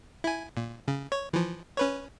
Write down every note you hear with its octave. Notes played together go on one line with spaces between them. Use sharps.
E4 G#5
A#2
C#3
C#5
E3 F3
C#4 B4 C#5